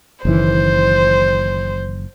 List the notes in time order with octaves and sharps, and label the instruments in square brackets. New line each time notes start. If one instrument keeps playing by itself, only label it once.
[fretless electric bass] F#1 D#3 E3 [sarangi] C5